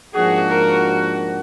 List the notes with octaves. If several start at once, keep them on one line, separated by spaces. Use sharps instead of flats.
G#2 F3 A#3 D4 F#4 G#4
A#4